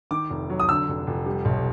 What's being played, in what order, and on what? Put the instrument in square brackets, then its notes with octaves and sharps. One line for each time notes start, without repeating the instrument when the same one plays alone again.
[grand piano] D#3 D6
F1
F#3
D#6
D3 E6
F1
F1
G3
B1